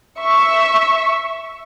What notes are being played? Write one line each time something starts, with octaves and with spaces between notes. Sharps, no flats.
E5 C#6